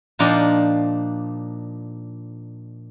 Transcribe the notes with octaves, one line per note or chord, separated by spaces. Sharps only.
A#2 F3 D4 D#4 D#5 G5